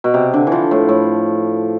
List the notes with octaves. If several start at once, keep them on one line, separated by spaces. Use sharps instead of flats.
B2
C3
D3
E3 F3
A2
A2